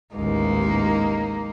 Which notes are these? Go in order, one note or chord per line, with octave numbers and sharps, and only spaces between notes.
A1 D#2 G#3 A#3 D#4